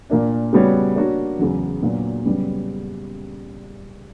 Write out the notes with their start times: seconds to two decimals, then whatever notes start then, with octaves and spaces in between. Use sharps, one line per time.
0.10 A#2 A#3 D4
0.53 C#3 G3 B3 F#4 C#5
0.96 A#3 D4 F#4 A#4 C#5
1.39 E2 C#3 F#3
1.82 A#2 F#3 B3 D4 F#4
2.25 F#2 C#3 G3 B3